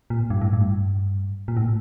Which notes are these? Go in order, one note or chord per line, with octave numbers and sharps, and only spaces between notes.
A#2
G2
A2
G2
A#2
A2